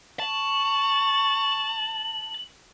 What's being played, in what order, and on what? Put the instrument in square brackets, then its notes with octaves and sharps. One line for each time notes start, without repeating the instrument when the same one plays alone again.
[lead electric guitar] A5 [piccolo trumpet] C#6 [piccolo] F#7